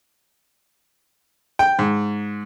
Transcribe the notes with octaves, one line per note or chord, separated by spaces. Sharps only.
G5
G#2